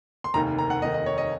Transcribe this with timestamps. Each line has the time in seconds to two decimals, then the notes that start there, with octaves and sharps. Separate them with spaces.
0.24 C6
0.34 F1 D#2 D#3 A#5
0.59 A#5
0.70 F#5
0.82 F1 D#2 D#3 D#5
0.94 D#5
1.06 C#5
1.18 D#5